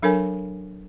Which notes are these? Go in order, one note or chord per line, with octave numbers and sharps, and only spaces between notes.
F#3 D4 A4 A#4 C#5 G#5